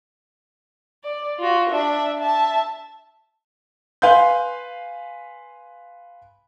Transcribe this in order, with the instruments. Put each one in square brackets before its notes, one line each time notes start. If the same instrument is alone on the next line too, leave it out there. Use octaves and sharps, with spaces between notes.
[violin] D5
F4 F#4
D4 E5
E5 A5
[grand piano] B4 F5 G#5 C6 G6